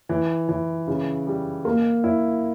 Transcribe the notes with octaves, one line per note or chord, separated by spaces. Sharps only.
E3
E3
C#3
G3
A#3
E4